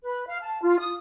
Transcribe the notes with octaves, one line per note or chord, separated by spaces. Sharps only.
B4
F5
A5
F4
D#6